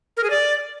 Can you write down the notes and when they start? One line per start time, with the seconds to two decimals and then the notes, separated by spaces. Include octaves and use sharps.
0.17 A#4
0.24 G#4
0.30 D5